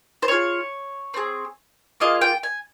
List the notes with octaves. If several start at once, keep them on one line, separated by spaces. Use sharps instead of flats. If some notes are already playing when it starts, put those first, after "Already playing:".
C5
C4 F4 G#4 C#5
C4 F4 G#4
A#3 F4 G#4 D#5
G5
G#5